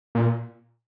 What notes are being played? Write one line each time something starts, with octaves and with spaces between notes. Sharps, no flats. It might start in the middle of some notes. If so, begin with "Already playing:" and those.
A#2